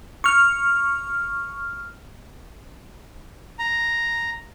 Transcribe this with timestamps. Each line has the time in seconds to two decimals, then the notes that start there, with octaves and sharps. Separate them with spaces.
0.24 C#6 F6
3.59 A#5